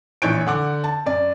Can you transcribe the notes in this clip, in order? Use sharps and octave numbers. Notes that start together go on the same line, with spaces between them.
A#1 E3 C#5 G6 D7
D3 F#5 D6
A5
F#2 D5